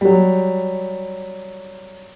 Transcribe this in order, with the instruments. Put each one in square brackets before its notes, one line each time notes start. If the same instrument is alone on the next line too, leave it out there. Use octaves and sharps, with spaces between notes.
[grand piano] F#3 G3